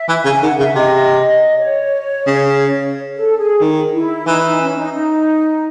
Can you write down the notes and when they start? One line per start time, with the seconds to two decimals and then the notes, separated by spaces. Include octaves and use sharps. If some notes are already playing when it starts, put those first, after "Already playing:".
Already playing: E5
0.09 E3
0.25 C#3 G#5
0.42 D#3 F#5
0.59 C#3 E5
0.76 C3 D#5
1.59 C#5
2.26 C#3
3.15 A4
3.38 G#4
3.61 D#3
3.93 E4
4.27 E3 D#4
4.44 D#4
4.61 C#4
4.77 D#4
4.94 D#4